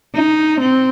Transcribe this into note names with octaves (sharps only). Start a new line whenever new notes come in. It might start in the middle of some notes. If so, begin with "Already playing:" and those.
D#4
C4